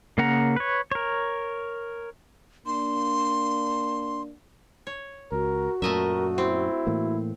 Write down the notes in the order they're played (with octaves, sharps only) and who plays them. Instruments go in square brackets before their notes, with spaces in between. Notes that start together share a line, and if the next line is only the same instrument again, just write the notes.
[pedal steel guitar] C#3 A#3 A#4 F#5 A#5
B4 C#5
A#4 C#5
[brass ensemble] A#3 D4 [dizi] C6
[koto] C#5
[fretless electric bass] C#2 [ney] F#4 [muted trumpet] A#4
[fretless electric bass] F#2 A#2 [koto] A3 D#5 E5 [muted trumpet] A#4
[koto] C4 [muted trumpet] E4
[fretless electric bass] A2 E3 A#3